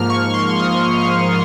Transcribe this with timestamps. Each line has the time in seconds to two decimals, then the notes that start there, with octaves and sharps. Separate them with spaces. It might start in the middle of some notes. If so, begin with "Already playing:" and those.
Already playing: G#2 F3 A#3 F6
0.10 C#6
0.34 C6
0.59 D#6